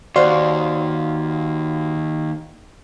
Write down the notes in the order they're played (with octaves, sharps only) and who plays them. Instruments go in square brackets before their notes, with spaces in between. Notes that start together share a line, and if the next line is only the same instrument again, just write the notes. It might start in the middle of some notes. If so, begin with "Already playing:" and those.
[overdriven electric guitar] D#2 [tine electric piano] F#4 F5 C6 [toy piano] C5 D5